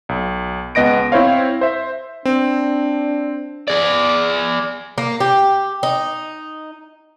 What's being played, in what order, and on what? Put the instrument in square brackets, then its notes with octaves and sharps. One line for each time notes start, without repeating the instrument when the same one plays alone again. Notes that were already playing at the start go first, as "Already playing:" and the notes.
[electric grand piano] B1
C#2 B3 D#5 A#6 D7
C4 E4 C5 C#5 F5
C5 E5
[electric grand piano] C4 [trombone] D4
[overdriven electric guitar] G#4 D5
[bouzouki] A#3
G4
D#4